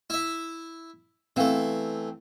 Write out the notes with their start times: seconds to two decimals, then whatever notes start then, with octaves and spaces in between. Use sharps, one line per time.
0.10 E4 E5
1.36 E3 A3 B3 C4 F5